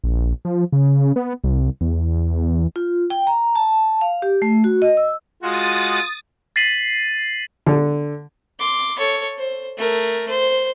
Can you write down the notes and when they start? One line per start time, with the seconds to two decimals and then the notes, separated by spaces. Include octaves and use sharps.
0.04 A#1
0.45 F3
0.73 C#3
1.16 B3
1.44 C2
1.81 E2
2.76 F4
3.10 G5
3.27 A#5
3.55 A5
4.01 F5
4.22 G4
4.42 A3
4.64 F#4
4.82 D#5
4.97 E6
5.43 G#3 F4 F#4 D#6 A6
6.56 A6 B6 C7 D#7 F#7
7.66 D3
8.59 C6 D6
8.98 A4 C#5
9.38 C5
9.77 A3 A#4
10.29 C5